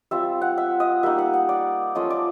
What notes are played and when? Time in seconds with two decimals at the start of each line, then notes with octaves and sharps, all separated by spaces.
0.11 G3 C4 F4 E5
0.41 F#5
0.58 E5
0.80 D#5
1.03 G3 A#3 D#4 E5
1.18 F#5
1.33 F#5
1.49 D5
1.95 F3 A3 C#4 F4 D#5
2.10 D5